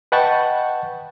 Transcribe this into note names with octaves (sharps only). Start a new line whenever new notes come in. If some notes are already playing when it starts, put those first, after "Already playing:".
B4 D#5 F#5 G5 A5 C#6